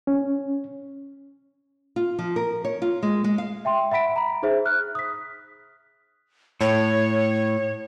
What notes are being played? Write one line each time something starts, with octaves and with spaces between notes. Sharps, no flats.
C#4
F4
F3
A#4
C#5
F4
G#3
G#3
F5
E5 G5 C6
E5 F#5 B5 B6 D7
A#5 B5
D#4 G#4 C5 E5
F6 F#6
D#6 B6
A2 C#5